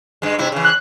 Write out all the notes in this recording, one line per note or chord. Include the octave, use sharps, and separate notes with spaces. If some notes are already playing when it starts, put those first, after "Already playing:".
G2 G#3
G2 C3 E4
C#3 E3
F#6